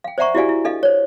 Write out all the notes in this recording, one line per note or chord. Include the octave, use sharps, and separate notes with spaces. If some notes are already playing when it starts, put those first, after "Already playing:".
F5 G5
C5 D5 E5 F#5 A#5 C#6
E4 F#4 G4 D5 F5 G#5
E4
D4 A4 D#5 F5
C5 C#5